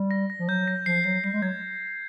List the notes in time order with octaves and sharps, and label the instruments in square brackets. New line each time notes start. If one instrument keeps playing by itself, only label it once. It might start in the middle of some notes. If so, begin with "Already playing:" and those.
Already playing: [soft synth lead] G3
[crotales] A#6
A#6
[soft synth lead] F3
[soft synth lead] F#3 [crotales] G6
[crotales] A#6
[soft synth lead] F3 [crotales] C7
[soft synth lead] F#3 [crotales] C7
[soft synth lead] G3 [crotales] C7
[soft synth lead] G#3
[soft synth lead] F#3 [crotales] G#6